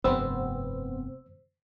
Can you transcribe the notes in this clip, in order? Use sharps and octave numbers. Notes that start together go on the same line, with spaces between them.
F1 G2 B3 C4 C5 E6